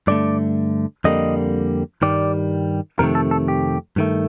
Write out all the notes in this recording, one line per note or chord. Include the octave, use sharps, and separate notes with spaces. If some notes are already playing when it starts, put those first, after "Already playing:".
G2 D3 A3 D5
F2 D3 G3 A#3 D#5
G2 D#3 G3 D5
F2 C3 D#3 A3 A#4
A4
A4
G4
G2 D#3 A3